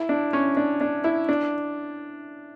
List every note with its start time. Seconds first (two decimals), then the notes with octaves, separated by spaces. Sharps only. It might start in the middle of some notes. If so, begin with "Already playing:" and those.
Already playing: E4
0.09 D4
0.33 C#4
0.57 D4
0.81 D4
1.04 E4
1.29 D4